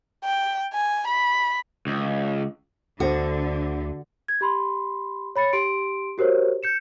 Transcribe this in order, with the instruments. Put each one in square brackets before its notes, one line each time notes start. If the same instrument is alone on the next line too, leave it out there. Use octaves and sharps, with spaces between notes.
[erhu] G5
G#5
B5
[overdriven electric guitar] C#2
[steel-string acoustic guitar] D2 [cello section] D3 [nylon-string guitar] F#4 [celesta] A4 C5
[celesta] G#6
G4 B5 C6
C#5 B5 A6 C#7
G4 C6 D7
F#4 G4 A#4 C5 C#5
G6 C#7 E7